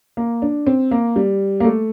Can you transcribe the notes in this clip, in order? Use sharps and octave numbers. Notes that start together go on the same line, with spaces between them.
A#3
D4
C4
A#3
G3
A#3
A3